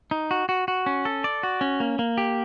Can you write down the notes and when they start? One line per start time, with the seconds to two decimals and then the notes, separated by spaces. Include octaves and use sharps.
0.11 D#4
0.31 F#4
0.49 F#4
0.68 F#4
0.86 C#4
1.05 A4
1.24 D5
1.43 F#4
1.61 C#4
1.80 A#3
1.99 A#3
2.18 G4